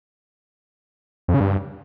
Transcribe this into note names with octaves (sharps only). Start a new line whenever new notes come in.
F2
C#3
G2